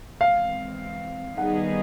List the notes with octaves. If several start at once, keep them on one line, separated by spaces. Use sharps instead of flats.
E3 G#3 C4 F5
D#3 G3 B3 D#4 G#4 F#5